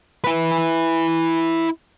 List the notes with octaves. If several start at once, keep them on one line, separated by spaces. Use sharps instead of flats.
E4 B4